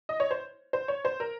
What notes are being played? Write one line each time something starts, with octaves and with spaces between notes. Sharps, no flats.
D#5
C#5
C5
C5
C#5
C5
A#4